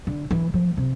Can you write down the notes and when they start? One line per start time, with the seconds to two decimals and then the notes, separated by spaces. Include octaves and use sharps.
0.07 D3
0.31 E3
0.54 F3
0.77 C3